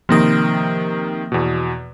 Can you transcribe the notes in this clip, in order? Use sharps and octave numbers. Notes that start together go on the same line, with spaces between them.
C3 D#3 F3 A#3 D#6
E2 B2